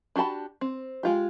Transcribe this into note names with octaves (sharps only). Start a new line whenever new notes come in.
D4 F#4 G4 A5 B5
C4
G#3 F4 G4